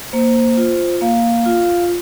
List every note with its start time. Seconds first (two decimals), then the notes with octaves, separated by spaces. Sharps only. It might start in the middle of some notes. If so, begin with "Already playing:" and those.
0.13 A#3 C5
0.57 F4
1.01 A#3 F5
1.46 F4